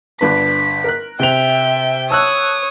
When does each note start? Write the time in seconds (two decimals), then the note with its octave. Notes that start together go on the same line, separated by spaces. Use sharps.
0.21 G1 D4 B4 B6
0.84 A#4 F#6
1.20 C3 E5 G5 F7
2.10 C#5 A5 D#6 E6 F#6